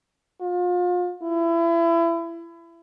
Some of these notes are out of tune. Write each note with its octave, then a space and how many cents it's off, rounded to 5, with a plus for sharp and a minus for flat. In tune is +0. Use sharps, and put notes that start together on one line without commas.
F4 +35
E4 +30